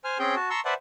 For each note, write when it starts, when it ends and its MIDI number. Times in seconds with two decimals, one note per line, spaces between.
0.04 0.18 72
0.04 0.18 80
0.04 0.18 89
0.19 0.35 60
0.19 0.35 61
0.19 0.35 68
0.19 0.35 79
0.19 0.35 84
0.36 0.50 66
0.36 0.50 81
0.50 0.60 81
0.50 0.60 82
0.50 0.60 84
0.50 0.60 85
0.50 0.60 88
0.65 0.74 71
0.65 0.74 72
0.65 0.74 74
0.65 0.74 76
0.65 0.74 78
0.65 0.74 81